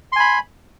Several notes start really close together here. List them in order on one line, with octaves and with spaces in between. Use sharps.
C6 G#5 B5